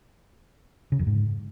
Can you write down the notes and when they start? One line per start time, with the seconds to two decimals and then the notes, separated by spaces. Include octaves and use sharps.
0.92 C#3
0.99 F2
1.07 G#2